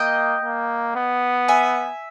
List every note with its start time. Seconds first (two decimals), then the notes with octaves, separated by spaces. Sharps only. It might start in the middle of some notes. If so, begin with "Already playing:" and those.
Already playing: A#3 D#5 G5
0.43 A#3
0.95 B3
1.48 E5 G#5